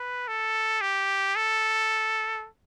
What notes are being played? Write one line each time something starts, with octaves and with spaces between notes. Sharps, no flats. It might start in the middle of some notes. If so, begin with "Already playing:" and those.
Already playing: B4
A4
G4
A4